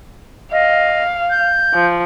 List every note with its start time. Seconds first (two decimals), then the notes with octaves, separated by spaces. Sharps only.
0.52 D#5 F5
1.30 G6
1.74 F3